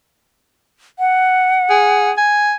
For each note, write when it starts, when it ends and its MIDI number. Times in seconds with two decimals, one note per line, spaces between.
0.99 2.11 78
1.70 2.12 68
2.18 2.54 80